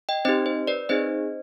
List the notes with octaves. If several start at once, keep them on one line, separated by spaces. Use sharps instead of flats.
D#5 G5
C4 D#4 G4 C5 D#5
C5
B4 D5
C4 D#4 G#4 C5 D#5